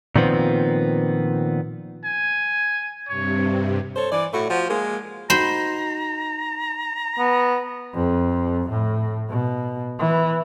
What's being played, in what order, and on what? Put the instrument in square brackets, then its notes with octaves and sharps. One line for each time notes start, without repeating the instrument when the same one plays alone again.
[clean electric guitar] A#2 D#3 F3 B3 C4
[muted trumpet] G#5
[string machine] G2 C3 [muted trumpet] C#5
[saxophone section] A4 C5 C#5
E3 D5
A2 A3 F#4
F3 F#4
G#3 A#3
[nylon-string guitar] D#4 F#4 [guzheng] C5 B5 [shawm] A#5
[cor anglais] B3
[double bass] F2
A2
B2
E3